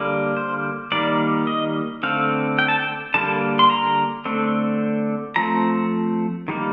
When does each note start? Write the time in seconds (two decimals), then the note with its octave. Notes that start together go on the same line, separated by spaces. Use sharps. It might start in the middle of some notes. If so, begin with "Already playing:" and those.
Already playing: D3 G3 A#3
0.37 C5
0.92 D#3 G3 A#3 D5
1.47 D#5
2.03 D3 A3 C4 F5
2.59 G5
2.68 A5
2.79 G5
3.14 D3 G3 A#3 A5
3.59 C6
3.70 A#5
4.25 D3 A3 C4
5.36 F3 A3 C4 A#5
6.48 D#3 G3 A#3